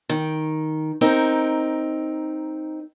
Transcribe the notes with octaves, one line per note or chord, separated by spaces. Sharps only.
D#3
C4 D#4 A#4